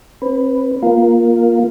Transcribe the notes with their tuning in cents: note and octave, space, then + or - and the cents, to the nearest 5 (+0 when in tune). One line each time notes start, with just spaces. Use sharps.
C4 +35 B4 +0
A#3 +20 F4 +5 A#4 +0